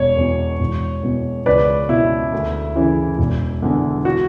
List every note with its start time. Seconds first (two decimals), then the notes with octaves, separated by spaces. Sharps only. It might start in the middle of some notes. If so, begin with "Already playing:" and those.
Already playing: E1 C#5
0.17 E2 B2
0.60 E1
1.03 E2 B2
1.46 C#2 B4 D5
1.89 B2 E4
2.33 D2
2.76 C#3 E3
3.19 E1
3.62 E2 D3
4.05 F#4